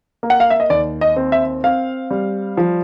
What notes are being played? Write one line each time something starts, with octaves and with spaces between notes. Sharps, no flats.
A#3
F#5
F5
E5
D#5
D#2 D5
D#5
C4
E5
C4 F5
G3
F3